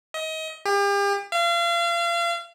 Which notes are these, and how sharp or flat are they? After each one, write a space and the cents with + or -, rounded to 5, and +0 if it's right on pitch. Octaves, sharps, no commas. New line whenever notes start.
D#5 +30
G4 +40
F5 -35